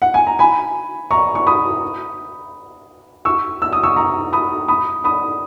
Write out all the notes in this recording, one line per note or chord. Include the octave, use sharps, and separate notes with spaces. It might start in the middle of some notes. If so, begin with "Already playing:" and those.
F#5
G#5
A#5
G#5 B5
A#5 C#6
C#6
B5 D#6
C#6 E6
E6
D#6
C#6 E6
A#5 C#6
B5 D#6
B5 D#6
B5 D#6